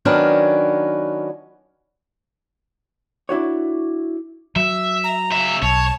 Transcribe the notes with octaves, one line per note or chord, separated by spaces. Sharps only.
D#3 F#3 B3 C#4 D4 A#4
D4 E4 F#4 C#5
F#3 E5
A#5
C#3 E5
B1 C#5 A5